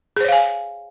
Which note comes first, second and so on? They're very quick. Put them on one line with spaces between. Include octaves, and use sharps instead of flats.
G#4 C5 C#5 F5 G#5